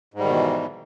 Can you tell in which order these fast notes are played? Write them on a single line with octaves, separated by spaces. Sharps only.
G#2 G3 D#3 B2 E3